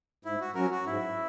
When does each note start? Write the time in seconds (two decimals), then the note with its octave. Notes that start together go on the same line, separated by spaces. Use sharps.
0.25 G#2 E4
0.41 F#4
0.55 F#3 C#4 F#4 A#4
0.71 F#4
0.86 G#2 E4